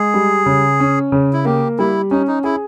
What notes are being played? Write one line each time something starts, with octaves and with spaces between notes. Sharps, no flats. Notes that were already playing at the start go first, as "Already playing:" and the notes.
Already playing: G#3 G#4
G3
C#3
C#4
C#3
E4
A#3 G4
G3 E4
C#4 D#4
D#4
E4 G#4